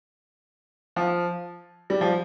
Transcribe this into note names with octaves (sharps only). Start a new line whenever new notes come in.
F3
G3
F3